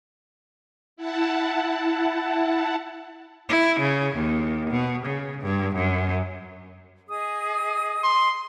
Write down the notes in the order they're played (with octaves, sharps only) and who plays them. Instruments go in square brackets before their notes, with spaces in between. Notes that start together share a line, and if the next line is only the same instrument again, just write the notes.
[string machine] E4 F#5 A5
[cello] E4
C#3
D#2
B2
C#3
G2
F#2
[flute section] G#4 D#5 D#6
[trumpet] C6